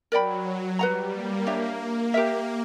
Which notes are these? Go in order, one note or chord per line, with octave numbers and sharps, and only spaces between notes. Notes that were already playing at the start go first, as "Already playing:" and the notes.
F#3 A#4 D5 G5 B5
G3 B4 F#5 A#5
A#3
A#3 D4 G4 C#5 E5
G4 A#4 E5